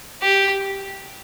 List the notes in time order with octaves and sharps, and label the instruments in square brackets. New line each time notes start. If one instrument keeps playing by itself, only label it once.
[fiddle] G4